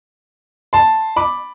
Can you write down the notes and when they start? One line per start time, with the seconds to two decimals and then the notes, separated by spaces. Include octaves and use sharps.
0.73 A5 C6
1.16 B5 D6